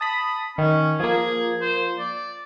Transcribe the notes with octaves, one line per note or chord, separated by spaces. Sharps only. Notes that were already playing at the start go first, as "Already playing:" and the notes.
A5 B5 D#6
D#3 C#4
F3 A#3 G#4
C5
D5